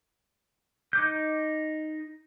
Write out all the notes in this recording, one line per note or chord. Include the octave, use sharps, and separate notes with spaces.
D#4 D6 G6